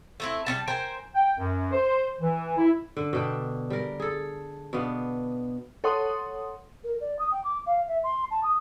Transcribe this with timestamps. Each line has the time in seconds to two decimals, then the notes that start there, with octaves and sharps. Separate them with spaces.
0.20 A3 C4 E4
0.46 G3 C#4 A5
0.68 A#4 C5 G5 G#5
1.14 G5
1.38 F#2
1.72 C5
2.20 E3
2.56 E4
2.97 D3
3.13 B2 D4 G5
3.70 G3 A#4
4.00 G#4 A4
4.73 B2 B3 D4 F5
5.84 A4 C#5 F#5 C6 D#6
6.84 A#4
7.01 D5
7.19 D#6
7.31 G5
7.44 D6
7.66 F5
7.88 E5
8.04 C6
8.31 A5
8.43 D#6